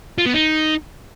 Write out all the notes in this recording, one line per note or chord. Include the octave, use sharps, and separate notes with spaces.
F4
B3
D#4